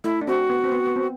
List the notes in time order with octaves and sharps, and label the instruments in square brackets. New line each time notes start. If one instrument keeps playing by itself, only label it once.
[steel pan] A3 [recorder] E4
[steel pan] D4
[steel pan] C4 [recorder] F#4
[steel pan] B3
C4
B3
B3
C4